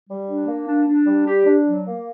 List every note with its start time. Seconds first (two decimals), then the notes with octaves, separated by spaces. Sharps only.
0.09 G3
0.28 D4
0.47 A#3
0.67 D4
0.87 D4
1.07 G3
1.26 G4
1.46 D4
1.65 F#3
1.85 A#3